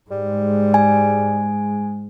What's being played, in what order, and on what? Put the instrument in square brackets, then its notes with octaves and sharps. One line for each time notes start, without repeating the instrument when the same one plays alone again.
[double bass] G#2 G#3 [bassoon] G3
[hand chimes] G#5